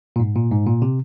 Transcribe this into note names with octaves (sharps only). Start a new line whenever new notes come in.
A#2
G#2
A#2
G#2
A#2
C3